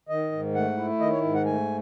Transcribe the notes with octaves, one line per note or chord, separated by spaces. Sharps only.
D#3 D#5
G#2
A3 F#5
E4
D#3 D#5
C#5
G#2
F#5
A3 G#5